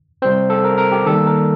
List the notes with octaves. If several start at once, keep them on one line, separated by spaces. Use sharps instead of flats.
C3 G3 C4 C5
A4
A#4
A#4
G4
D#3 G3 A#3 A4
A#4